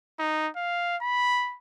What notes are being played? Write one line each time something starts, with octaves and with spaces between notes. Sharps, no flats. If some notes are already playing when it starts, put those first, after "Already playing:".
D#4
F5
B5